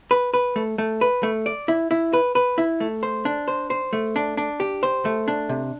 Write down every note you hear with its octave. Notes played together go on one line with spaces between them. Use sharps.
B4
B4
A3
A3
B4
A3
D5
E4
E4
B4
B4
E4
A3
C5
D4
C5
C5
A3
D4
D4
G4
C5
A3
D4
C3